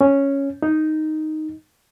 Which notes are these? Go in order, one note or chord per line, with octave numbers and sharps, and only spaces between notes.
C#4
D#4